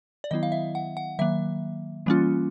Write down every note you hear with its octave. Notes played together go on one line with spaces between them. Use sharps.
D5
D#3 F#3 B3 E4 D#5
F5
E5
F#5
F#5
D#3 F#3 A#3 E5
E3 G3 A#3 C#4 F4